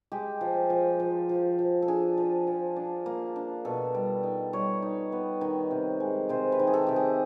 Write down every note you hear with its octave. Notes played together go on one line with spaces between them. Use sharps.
G#3 G4
F3
F3
F3
F3
F3
A4
D4 G#4
F3
F3
D4
A#3
D4
B2 A4
G3
D#4
G3 C#5
D#4
B3
D#3
C3
G#3
C3 C5
B4
D#3
G#4
A4
C3 G4
G#4